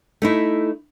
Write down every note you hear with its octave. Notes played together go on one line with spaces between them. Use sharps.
A3 D#4 E4